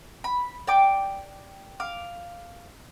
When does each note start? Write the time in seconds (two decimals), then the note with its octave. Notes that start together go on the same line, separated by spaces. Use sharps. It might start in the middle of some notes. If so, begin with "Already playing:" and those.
0.24 B5
0.67 D5 G5 D6
1.80 F5 D6